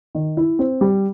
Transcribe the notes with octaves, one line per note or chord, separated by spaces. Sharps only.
D#3
E4
C4
G3